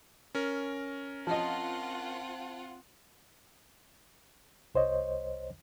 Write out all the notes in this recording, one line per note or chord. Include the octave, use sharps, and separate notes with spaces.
C#4 A#4
F3 C4 F4 D#5 F#5 A5
C2 C5 C#5 D#5